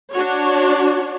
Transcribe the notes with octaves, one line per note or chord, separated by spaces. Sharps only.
D4 F#4 C#5